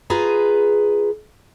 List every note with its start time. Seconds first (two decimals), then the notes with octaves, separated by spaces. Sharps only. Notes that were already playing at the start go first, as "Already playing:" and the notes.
0.10 F4 G#4 B4 A#5